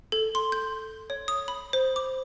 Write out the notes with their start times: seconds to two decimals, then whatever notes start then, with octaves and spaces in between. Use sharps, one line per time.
0.12 A4
0.35 C6
0.52 G6
1.10 C#5
1.28 D#6
1.48 B5
1.73 C5
1.96 D6